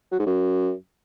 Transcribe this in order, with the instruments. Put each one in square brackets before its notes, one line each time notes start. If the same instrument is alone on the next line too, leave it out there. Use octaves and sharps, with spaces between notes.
[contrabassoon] F#3
G#2
F#2